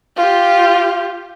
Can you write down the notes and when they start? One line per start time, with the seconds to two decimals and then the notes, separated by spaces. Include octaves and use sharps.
0.16 F4 G4